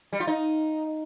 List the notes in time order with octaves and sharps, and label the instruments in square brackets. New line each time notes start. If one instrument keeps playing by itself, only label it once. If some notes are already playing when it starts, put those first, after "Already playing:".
[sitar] G3
F4
D#4